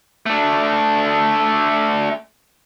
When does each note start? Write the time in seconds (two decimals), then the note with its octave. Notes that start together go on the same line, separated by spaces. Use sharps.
0.26 A3 D4